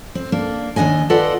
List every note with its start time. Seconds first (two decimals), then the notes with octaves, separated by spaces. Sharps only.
0.15 C4
0.32 A#3 D4
0.76 D#2 E3 D4 D#5 G#5
1.10 F4 A4 B4 D5 D#5 F#5